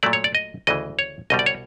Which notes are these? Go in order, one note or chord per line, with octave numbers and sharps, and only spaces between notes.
A#2 F#3 A3 D5
C#5
D5
D#5
D2 C#3 E3 D#5
C#5
C2 B2 G3 D#5
D5
C#5